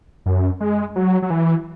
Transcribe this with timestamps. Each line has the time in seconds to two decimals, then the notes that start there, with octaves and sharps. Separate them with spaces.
0.26 F#2
0.60 G#3
0.96 F#3
1.22 F#3
1.30 E3